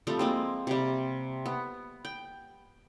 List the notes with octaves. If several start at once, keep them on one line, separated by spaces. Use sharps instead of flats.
F3 G3 A3 C4
G#3 A#3 C4
C3 G3
B3
G5